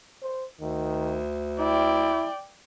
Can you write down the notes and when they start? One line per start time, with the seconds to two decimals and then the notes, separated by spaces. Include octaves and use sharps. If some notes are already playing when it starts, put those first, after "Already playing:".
0.22 C5
0.60 D2 D#3
1.59 E4 D5 G5